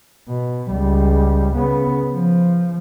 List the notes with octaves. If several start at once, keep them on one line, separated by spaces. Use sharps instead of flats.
B2
C#2 G3
C#3 B3
F3